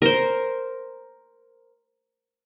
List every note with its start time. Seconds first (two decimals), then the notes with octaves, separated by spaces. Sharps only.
0.02 A#4 C5